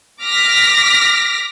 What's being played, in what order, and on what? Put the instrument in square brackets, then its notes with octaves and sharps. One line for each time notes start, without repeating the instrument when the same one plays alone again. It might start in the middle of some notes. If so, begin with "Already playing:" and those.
[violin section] D6 F6 A#6 B6